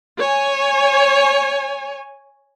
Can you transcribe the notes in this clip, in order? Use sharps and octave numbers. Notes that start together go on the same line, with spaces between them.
C#5 G#5